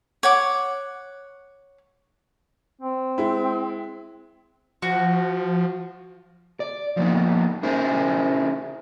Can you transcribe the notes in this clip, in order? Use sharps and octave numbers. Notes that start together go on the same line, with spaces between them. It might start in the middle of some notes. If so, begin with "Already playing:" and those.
C#5 F#5 D6
C4
G#3 E4
F3 F#4
D5
F3 A#3 B3 D#4
C#4 D#4 E4 G#4 A#4 C5